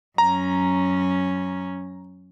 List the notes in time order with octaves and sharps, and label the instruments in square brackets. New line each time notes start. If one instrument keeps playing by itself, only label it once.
[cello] F#2 C#4 [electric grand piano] A#5